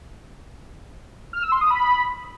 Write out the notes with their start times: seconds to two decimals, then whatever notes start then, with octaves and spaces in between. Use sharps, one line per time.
1.33 F6
1.42 E6
1.52 C6
1.61 D#6
1.70 B5